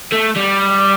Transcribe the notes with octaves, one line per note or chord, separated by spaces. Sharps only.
A3
G3